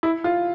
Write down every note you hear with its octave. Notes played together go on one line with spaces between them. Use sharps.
E4
F4